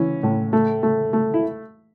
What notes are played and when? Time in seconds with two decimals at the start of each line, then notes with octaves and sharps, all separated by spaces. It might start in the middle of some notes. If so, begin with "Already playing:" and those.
Already playing: E3 C#4
0.23 A2
0.53 A3
0.83 A3
1.13 A3
1.34 E4